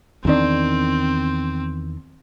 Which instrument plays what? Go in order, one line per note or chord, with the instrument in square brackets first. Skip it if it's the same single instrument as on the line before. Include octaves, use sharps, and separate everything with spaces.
[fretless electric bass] E2 D#3 D4 [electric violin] C4